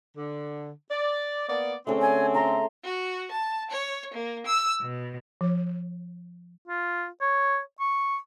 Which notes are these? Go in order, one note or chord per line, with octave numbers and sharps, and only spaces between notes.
D3
D5
A#3 B3 D5
D3 A3 C4 C#4 G#4
G#5
E5 A#5 C6
F#4
A5
C#5
A#3
E6
B2
F3 C#5
F4
C#5
C#6